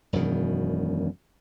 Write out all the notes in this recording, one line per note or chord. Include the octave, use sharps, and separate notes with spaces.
E1 F#2 B2 D#3